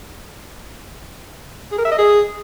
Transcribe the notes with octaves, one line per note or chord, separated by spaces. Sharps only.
G#4
A#4
E5
D#5
G#4